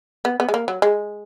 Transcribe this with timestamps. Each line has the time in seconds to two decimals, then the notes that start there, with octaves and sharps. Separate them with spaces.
0.25 B3
0.40 B3
0.49 G#3
0.54 A#3
0.68 F#3
0.82 G#3